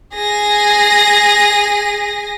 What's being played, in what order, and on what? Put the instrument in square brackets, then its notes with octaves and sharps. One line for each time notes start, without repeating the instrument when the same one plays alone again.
[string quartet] G#4 A#6